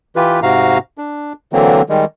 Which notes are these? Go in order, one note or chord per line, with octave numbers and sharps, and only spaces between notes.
E3 F4 G4 B4
G#2 C3 F#4 F5 A#5
D4
D3 E3 F#3 A#3 C4
D#3 G3 G#3